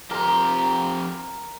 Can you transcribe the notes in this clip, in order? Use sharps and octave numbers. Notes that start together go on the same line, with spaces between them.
F2 G4 A#4 A#5 C6